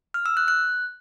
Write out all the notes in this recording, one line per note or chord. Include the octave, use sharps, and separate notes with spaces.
F6
E6
F#6
F#6